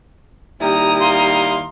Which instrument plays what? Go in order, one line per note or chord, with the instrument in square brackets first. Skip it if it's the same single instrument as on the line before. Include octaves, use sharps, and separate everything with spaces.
[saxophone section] D#2 G3 E4 [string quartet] A#5 D#6
[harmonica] F5 C6